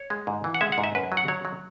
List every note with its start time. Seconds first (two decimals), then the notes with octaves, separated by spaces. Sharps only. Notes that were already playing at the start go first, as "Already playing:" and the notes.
Already playing: C#5
0.10 G#3
0.27 G#2
0.44 E3
0.54 F#5
0.61 G#3 E5
0.72 F#5
0.78 G#2
0.84 E5
0.95 F#2 B4
1.12 F#3
1.17 F#5
1.28 F#3 C#5
1.45 F#3